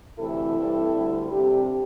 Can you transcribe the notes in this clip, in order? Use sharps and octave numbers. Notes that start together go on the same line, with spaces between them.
D2 C3 E3 A3 C4 E4 A4
G2 G3 C4
D2 D3 G3
C3 G3 C4 D4 G4